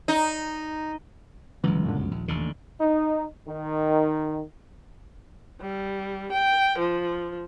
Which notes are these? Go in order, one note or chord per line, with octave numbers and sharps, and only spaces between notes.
D#4
G1 C#2 E3 F#3
F#2 A#2 D3
C2 F#2
D#1 A#1
A1 D#2 D3
D#4
D#3
G3
G5
F3